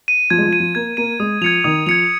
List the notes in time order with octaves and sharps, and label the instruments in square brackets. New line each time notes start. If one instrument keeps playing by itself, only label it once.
[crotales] D#7
[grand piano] F3 [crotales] G#6
[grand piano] G#3
F3
[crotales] D#7
[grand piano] F3
[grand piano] A#3 [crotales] G#6
[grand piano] A#3 [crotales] D#7
[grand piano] G#3 [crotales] D#6
[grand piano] F3 [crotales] G#6 C#7 F7
[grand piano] D#3 [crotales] D#6
[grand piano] F3 [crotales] G#6 C#7 F7